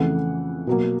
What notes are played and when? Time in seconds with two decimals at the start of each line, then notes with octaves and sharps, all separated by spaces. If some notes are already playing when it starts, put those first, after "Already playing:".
Already playing: F2 C#3 E3 A3 F#5
0.67 B2 F#3 A#3